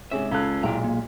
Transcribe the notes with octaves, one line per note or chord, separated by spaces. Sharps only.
G#2 C3 C#4 G#4 E5
C#2 C#4 F4 A4 F#6
B1 A#2 G#3 E4 G5 A#5
A#3